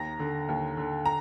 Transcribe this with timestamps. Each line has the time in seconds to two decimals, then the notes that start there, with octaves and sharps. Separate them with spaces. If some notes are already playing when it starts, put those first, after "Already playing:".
Already playing: D#2 A#5 A#6
0.19 D3
0.49 D#2
0.77 D3
1.06 A#5